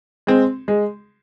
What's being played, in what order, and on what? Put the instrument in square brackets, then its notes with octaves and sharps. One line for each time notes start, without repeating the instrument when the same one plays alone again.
[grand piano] G#3 C4
G#3